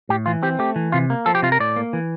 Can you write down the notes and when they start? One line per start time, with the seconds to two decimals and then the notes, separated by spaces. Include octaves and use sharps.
0.09 A2 G4
0.26 E3 F4
0.43 C4 G4
0.59 A3 G4
0.76 E3
0.92 C3 F4
1.10 A#3
1.26 F3 A4
1.35 G4
1.42 C3 F4
1.52 A#4
1.60 A2 D5
1.76 A#3
1.93 E3